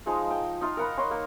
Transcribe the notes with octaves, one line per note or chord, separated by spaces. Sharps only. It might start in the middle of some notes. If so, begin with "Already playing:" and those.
F3 G#3 D#4 F5
G5
D#4 F4 F5
A#4 F#5 B5
C#5 D#5 C6
A#3